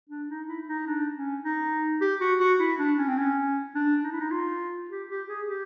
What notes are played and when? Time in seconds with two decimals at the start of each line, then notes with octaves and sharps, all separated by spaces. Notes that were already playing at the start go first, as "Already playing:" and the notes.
0.09 D4
0.29 D#4
0.48 E4
0.68 D#4
0.86 D4
1.15 C#4
1.44 D#4
2.01 G4
2.21 F#4
2.40 F#4
2.59 E4
2.78 D4
2.98 C#4
3.07 C4
3.17 C#4
3.75 D4
4.04 D#4
4.11 E4
4.20 D#4
4.31 F4
4.90 G4
5.09 G4
5.28 G#4
5.47 G4